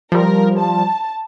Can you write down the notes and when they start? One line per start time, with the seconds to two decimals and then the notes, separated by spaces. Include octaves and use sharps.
0.12 F3 G3 A#4
0.58 A5